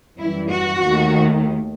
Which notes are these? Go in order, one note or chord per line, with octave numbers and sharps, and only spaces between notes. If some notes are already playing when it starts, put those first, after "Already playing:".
F#2 E3 G3 E4
F#4
D#2 D#3 A3